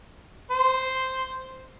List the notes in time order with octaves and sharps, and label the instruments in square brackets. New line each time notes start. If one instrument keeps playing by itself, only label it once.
[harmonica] C5